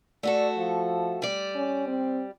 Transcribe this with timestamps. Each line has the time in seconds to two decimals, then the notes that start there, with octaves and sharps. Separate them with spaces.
0.23 A3 F#4 A4 D5
0.58 F3
1.22 G3 D5
1.55 C#4
1.87 C4